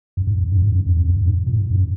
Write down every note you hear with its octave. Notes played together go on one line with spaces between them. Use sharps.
F#2
G#2
F2
F#2
G#2
F#2
F2
F#2
F2
F#2
G#2
A#2
G#2
F#2